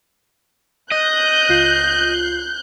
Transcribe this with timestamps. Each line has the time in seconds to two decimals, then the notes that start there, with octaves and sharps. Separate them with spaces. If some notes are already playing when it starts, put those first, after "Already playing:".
0.92 D#5 F#6 G6
1.49 C#2 F4 C7